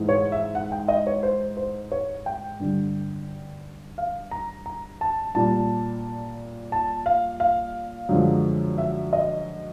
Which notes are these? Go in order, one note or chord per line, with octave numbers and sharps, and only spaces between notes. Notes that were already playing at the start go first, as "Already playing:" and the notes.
Already playing: G#2 E3 G#3
C#5
E5
F#5
G5
D#5
C#5
C5
C5
C#5
G5
G2 D3 G3
F5
A#5
A#5
A5
A#2 G3 A5
A5
F5
F5
F#2 D3 F3 G#3
E5
D#5